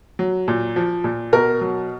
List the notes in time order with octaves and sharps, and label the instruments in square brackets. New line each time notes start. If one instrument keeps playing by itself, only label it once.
[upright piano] F#3
A#2
F3
A#2
B2 A#4
F#3